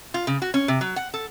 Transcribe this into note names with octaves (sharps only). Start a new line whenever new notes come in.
F4
C#3
F#4
C#4
C3
F#3
F#5
A4